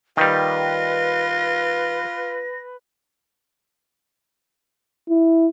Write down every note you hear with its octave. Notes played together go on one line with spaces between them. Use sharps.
D#3 G3 F4 B4 A#6
E4